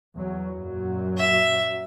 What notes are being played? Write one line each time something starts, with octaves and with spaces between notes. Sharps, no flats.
E2 F#3
F#2 A#2 F#3
E5